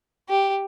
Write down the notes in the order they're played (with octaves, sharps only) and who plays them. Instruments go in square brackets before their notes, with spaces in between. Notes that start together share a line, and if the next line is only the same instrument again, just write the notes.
[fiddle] G4